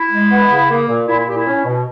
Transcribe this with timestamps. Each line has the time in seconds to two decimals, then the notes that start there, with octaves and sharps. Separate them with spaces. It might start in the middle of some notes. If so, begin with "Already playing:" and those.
Already playing: E4
0.11 G#3
0.31 B3
0.50 C#3
0.70 A#3
0.88 A#2
1.08 A#2 E4
1.18 E4
1.27 A#2 G4
1.37 E4
1.47 C#4
1.65 B2